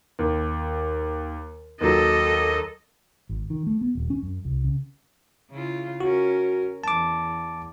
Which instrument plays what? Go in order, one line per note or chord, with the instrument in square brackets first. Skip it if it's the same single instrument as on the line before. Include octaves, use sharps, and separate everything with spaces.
[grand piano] D#2
[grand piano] D#2 F#3 [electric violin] A4 D#5
[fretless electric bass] G#1
D#3
A3
B3
D#1
C#4
F#2
C2
C#3
[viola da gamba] C#3 E4 F4
[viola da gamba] C#4 A#4 [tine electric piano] F#4
[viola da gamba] E2 [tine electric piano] A5 D6